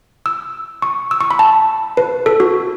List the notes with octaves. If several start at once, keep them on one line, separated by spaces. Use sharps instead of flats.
E6
C#6
E6
C#6
B5
A5
B4
A4
F#4